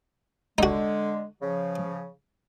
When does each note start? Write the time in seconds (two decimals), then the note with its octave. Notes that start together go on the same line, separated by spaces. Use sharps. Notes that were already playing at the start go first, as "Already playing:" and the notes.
0.58 D3 G#3 D#4 F#4
1.42 C#3 F3